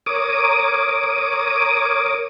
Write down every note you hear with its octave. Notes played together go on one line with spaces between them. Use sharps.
A#4 C#5 D6 D#6